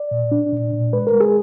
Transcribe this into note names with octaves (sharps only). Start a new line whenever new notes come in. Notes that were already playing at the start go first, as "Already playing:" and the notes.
Already playing: D5
A#2
D4
A#2
A#2
G#3 B4
A#4
G#3
G#4